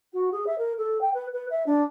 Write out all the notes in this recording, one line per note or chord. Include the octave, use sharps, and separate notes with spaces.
F#4
G#4
E5
A#4
A4
G5
B4
B4
E5
D4